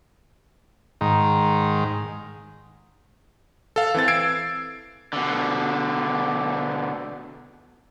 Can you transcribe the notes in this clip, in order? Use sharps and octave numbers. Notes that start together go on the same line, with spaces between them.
G#2 D#3
A4 F5
E3 C4 A6
E6 G#6 C7 D7
B2 D3